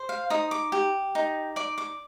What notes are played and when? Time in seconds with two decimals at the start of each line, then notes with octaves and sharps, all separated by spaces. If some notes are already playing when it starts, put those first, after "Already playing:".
Already playing: C5
0.09 F5
0.30 D#4 D#6
0.51 D6
0.72 G4
1.15 D#4
1.56 D5 D6
1.78 D6